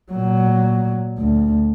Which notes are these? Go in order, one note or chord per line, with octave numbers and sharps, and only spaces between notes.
A#2 F#3
D2